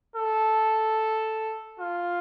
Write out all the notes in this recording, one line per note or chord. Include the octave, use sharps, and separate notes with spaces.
A4
F4